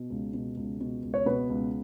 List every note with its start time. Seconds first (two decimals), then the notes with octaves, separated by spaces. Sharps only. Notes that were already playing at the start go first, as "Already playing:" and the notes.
Already playing: B2
0.10 C#2
0.34 B2
0.57 C#2
0.81 B2
1.03 C#2
1.14 C#5
1.26 B2 B3 B4
1.50 C#2